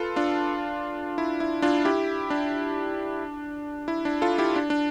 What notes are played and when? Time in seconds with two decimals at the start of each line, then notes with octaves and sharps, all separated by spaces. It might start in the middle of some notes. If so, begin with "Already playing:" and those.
Already playing: F4 A4 B4
0.16 D4 F4
1.18 E4
1.40 E4
1.62 D4 F4
1.85 E4 G4
2.30 D4
3.88 E4
4.05 D4
4.22 F4 A4
4.38 E4 G4
4.56 D4
4.70 D4